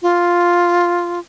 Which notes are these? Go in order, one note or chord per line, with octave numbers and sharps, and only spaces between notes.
F4